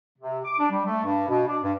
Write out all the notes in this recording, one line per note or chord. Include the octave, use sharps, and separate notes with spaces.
C3
D6
D4
G3
A3
G2
B2
D4
G2